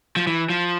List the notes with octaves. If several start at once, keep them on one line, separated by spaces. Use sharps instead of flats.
F3
E3
F3